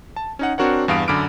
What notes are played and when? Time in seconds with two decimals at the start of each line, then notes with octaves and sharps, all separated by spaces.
0.16 A5
0.39 C#4 D#4 F#5
0.58 C4 D4 F#4 A#4 C#5 F#5
0.88 E2 G2 F5 D#6 D7
1.08 F#2 D3 B5 D6 F6 D7